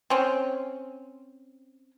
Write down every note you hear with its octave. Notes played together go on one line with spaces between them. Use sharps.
C4 C#4